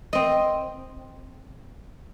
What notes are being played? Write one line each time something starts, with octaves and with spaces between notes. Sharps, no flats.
C4 D#5